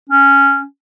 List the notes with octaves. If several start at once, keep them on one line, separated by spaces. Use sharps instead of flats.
C#4